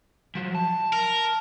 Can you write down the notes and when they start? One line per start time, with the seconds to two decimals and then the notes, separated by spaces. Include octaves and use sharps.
0.35 F3 F#3
0.55 A5
0.93 A#4